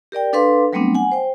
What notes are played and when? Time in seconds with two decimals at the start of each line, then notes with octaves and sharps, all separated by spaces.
0.12 G4 A#4 D5 G5
0.33 D4 A4 B4 F5 C6 D6
0.73 F#3 G3 A3 B3 C4 D4
0.95 F#5 G#5
1.12 C5 G5